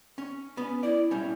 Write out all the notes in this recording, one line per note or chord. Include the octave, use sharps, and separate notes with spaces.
C#4
B3 C#4
E4 D5
B2 G3 C#4